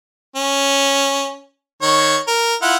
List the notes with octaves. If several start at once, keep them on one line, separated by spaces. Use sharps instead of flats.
C#4
D#3 C#5
A#4
E4 F4 F#5